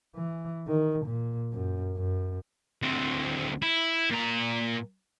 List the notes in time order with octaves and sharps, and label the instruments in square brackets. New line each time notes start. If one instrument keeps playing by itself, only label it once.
[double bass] E3
D#3
A#2
F#2
F#2
[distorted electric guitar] D2 C4
E4
A#2 A#5